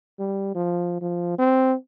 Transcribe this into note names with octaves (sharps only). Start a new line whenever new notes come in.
G3
F3
F3
C4